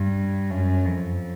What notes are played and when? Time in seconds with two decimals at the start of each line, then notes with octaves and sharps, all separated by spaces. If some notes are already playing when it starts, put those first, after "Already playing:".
Already playing: G2
0.50 F#2
0.86 F2